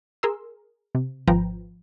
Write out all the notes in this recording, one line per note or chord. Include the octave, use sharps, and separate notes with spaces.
G#4 A#4 C6 E6
C3
G#1 F3 B4 G5 A#5